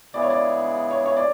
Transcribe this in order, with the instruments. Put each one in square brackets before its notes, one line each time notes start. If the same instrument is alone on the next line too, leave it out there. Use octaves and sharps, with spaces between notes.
[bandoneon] C#3 G#3 B3 E4 G#4 [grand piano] D5
[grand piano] C#5
D5
C#5
C#5
D5